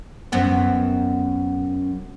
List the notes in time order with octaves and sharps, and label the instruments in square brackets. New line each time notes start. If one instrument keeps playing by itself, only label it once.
[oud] F#2 B3 C4